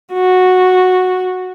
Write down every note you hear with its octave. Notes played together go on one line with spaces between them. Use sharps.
F#4